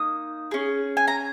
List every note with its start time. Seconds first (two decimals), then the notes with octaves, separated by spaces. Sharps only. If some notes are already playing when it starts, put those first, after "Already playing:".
Already playing: A#3 D#4 D#6
0.51 C#4 G#4
0.97 G#5
1.08 A#5